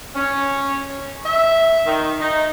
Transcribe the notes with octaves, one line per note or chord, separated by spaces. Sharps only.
C#4
E5
D#3
D#4